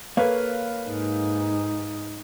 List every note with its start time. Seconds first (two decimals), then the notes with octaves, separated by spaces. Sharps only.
0.17 A#3 A4 B4 C#5 F5
0.88 G#2 D#4